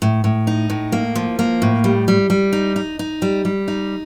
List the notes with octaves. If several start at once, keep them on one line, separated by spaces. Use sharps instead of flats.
A2
A2
D#4
A2
A#3
F3
A#3
A2
G3
G3
G3
D#4
D#4
D#4
G3
G3
D#4